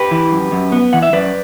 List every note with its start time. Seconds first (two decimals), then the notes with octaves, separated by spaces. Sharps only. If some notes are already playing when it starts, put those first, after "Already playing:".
Already playing: G4 B4
0.11 E3
0.32 F#2
0.52 F#2
0.72 B3
0.93 E3 F#5
1.03 E5
1.13 F#2 B4 D5